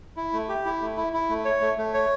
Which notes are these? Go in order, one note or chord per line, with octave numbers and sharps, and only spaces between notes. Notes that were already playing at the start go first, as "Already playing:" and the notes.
E4
A3
G4
E4
A3
E4
E4
A3
C#5
A3
A3
C#5